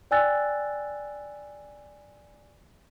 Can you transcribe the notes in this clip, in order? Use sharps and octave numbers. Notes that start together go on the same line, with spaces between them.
D5 G5 G#5 E6 F#6 A6